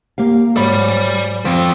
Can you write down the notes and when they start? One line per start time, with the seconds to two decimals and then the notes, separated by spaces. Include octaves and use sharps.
0.18 A#3 G4 F5
0.57 G#2 F#4 C#5 D5 B5
1.45 F3 C4